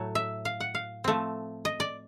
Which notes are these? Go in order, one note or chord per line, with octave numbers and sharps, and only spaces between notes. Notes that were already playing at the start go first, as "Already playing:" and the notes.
Already playing: A2 F#3 A3
E5
F5
F#5
F5
F3 A3 C4
D#5
D5